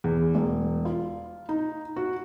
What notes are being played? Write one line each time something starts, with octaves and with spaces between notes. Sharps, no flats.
E2
E1
F4
D#4
F#4